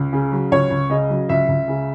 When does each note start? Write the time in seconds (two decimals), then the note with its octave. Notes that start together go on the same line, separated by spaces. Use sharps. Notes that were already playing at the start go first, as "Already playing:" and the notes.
Already playing: C#2
0.13 C#3
0.32 F#3
0.52 C#2 C#5
0.70 C#2
0.90 C#3 D#5
1.09 F#3
1.29 C#2 E5
1.49 C#2
1.68 C#3